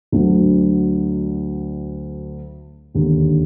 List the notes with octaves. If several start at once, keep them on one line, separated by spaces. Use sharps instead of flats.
D2 D3 F#3
E1 D#2 D3